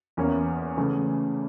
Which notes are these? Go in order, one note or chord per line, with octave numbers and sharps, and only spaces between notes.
E2 E3 A#3 C#4
C#3 E3 A3